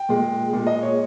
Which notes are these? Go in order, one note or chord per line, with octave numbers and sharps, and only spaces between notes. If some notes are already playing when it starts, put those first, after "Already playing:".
Already playing: G5
A#2 G#3
A#2 G#3
D#5
C#5